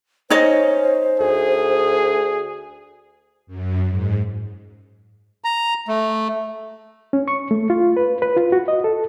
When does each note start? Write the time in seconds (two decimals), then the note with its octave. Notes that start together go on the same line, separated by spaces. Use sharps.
0.30 C#4 D#4 C5 C#5 D#5
1.19 D2 G#4
3.47 F#2
3.88 G#2
5.44 A#5
5.88 A3
7.13 C#4
7.28 C#6
7.51 A3
7.70 F4
7.97 B4
8.22 B4
8.37 F4
8.52 F#4
8.68 D#5
8.84 A4